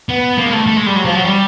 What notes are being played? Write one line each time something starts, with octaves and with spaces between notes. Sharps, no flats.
B3
A#3
G#3
A3
A3
G#3
G3
F#3
F3
F#3
G3